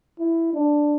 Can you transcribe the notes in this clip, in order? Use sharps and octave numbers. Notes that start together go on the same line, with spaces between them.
E4
D4